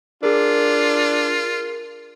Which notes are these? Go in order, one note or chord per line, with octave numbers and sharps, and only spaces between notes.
D4 F4 G#4 A#4